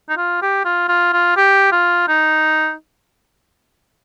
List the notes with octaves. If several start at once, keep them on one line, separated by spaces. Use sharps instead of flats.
D#4
F4
G4
F4
F4
F4
G4
F4
D#4